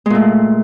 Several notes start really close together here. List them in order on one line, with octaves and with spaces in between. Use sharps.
G#3 A#2 A3